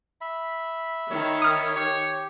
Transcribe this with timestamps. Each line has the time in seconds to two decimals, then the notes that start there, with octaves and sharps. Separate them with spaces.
0.21 E5 B5
1.11 D#3 C#5
1.42 D#6 F6
1.75 G4 C#5